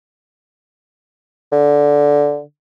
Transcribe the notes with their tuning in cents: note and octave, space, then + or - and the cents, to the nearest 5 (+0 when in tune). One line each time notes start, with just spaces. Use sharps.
D3 -10